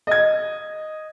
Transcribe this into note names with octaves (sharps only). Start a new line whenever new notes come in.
D#5 G#6